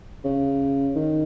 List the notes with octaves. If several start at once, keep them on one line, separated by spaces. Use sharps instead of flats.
C#3
D#3